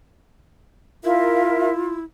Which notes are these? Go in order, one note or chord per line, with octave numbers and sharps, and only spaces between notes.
E4 F4 A#4 E5 F5